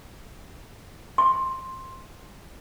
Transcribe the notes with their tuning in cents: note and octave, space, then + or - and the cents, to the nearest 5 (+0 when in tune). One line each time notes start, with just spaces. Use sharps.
C6 +10